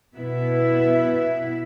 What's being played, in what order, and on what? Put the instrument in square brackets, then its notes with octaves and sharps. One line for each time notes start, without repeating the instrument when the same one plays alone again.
[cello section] B2 B3 E4 B4 E5